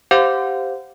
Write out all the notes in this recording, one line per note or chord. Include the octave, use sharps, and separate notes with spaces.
G4 C5 F5 F#5 D6 G6